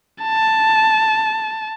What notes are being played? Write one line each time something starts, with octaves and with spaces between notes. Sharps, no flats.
A5